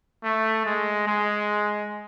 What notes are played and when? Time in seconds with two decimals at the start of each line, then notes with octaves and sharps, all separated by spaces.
0.24 A3
0.66 G#3
1.08 G#3